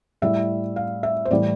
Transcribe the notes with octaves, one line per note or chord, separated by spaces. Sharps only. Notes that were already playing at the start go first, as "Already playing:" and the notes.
A2 G3 E5
F5
E5
C5
A2 E3 G3 D5